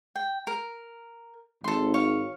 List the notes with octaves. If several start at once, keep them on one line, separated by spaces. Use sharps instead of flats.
G5
A#4
G#1 A4 C6
C#5 F5